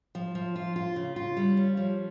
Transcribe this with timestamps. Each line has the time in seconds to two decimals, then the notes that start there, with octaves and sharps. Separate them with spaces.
0.15 F3
0.35 F3
0.56 F4
0.76 F4
0.96 C#3
1.16 F4
1.37 G3
1.57 C#4
1.77 F3